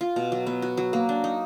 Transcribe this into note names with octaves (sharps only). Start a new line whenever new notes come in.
F4
B2
F#3
B3
F#4
F#3
A#3
D4
D#4